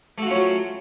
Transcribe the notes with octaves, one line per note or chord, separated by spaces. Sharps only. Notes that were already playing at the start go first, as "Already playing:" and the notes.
F#3 A3 C#4 F4 F#4